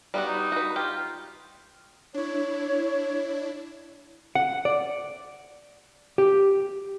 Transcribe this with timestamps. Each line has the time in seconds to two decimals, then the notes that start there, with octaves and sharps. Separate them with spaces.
0.14 G3 B3 F#4
0.27 D#4
0.52 F#4 B4
0.76 F4 G4
2.14 D4 E4 C#5
4.35 F#5
4.65 D5
6.18 G4